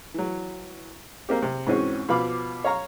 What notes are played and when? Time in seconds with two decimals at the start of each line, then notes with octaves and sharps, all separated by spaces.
0.14 E3 F#3
1.29 A#3 C4 G4
1.42 C3
1.67 G#2 E3 C4 C#4 F#4
2.09 B2 F3 B3 F5 B5 D6
2.65 C#5 F5 A#5 C#6